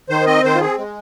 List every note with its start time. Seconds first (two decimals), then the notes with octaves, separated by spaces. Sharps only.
0.09 D#3 C5
0.26 C4 D#5
0.43 D#3 C5
0.55 F4
0.60 C4 G#4
0.78 G#3